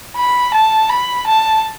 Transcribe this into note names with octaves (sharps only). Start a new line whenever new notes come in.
B5
A5
B5
A5